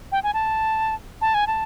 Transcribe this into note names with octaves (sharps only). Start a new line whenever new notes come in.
G5
G#5
A5
A5
G#5
A5